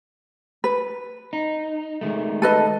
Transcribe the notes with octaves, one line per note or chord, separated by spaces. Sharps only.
B4
D#4
D#3 G#3 A3
A4 B4 D#5